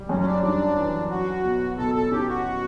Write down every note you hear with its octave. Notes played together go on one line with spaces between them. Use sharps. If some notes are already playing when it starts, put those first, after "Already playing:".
Already playing: G3
F#2 C#4
C#4
D4
G3 D4
E3
F#3 F#4
B2
B2 A4
A4
C#4 G4
F#4